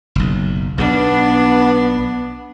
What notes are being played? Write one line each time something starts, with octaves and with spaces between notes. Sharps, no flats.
F#1 B1
B1 B3 D4